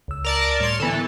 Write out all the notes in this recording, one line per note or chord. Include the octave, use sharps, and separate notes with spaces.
C#2 E6
A#4 D5 A5
A2 G3 C#5 C6
D3 E3 B3 A4